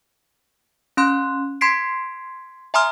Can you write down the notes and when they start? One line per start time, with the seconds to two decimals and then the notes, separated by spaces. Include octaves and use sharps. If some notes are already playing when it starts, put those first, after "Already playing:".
0.97 C#4 C6 F#6
1.61 C6 G#6 B6 C7 D7
2.74 E5 G#5 A#5 C6 D#6 F6